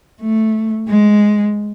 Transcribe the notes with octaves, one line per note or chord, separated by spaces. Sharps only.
A3
G#3